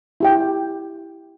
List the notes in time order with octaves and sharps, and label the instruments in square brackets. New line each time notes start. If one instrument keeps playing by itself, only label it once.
[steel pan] E4 G4 G5